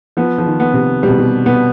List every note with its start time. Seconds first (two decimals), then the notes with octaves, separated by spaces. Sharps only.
0.17 F3 B3
0.38 F3
0.46 D#3
0.60 B3
0.74 C3
1.03 B2 G3
1.10 C3
1.18 B2
1.46 B2 B3